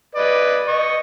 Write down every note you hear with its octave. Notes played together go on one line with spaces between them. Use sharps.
B4 D5 D#5
D#5 C#6